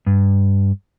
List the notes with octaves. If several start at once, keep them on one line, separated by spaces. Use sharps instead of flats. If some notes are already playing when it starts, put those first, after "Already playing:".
G2